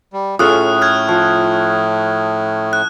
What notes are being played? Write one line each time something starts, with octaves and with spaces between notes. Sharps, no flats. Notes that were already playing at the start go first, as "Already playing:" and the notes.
G3
A2 C#4 F4 G#4 A4 D#6 F#6
F6 F#6 G#6
F3
F#6